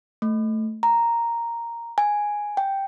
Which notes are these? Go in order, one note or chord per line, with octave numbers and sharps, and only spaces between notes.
A3
A#5
G#5
G5